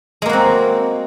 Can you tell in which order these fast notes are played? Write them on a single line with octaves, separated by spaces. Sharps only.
G#3 A#3 F#4 C4